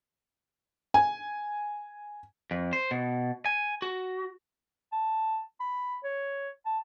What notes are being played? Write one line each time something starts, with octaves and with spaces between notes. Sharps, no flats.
G#5
F2
C5
B2
G#5
F#4
A5
B5
C#5
A5